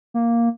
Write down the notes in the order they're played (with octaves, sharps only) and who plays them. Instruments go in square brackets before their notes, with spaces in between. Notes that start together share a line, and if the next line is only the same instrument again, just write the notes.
[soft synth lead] A#3